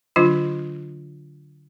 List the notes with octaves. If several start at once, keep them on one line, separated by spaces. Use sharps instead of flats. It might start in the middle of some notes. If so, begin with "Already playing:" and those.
D3 F#3 D4 F4